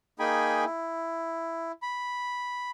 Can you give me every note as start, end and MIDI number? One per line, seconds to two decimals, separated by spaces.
0.19 0.64 58
0.19 0.64 63
0.19 0.64 68
0.19 0.64 79
0.19 0.64 80
0.19 0.64 83
0.65 1.72 64
1.82 2.71 83